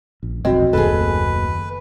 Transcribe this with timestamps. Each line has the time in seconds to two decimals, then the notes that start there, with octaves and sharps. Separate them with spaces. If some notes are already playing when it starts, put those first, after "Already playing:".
0.23 A#1
0.45 E1 B1 F2 C4 F#4 D#5
0.73 F#1 D#2 A2 G#4 A4 B4